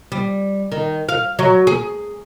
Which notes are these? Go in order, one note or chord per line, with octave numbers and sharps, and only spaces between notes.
G3
D#3
F5
F#3
G#4